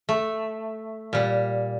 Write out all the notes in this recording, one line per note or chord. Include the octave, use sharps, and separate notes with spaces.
A3
A#2 G3